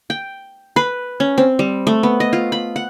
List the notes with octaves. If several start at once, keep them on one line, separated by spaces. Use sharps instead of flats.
G5
B4
C#4
C4
G3
A3
B3
D#5
F4
B5
F#5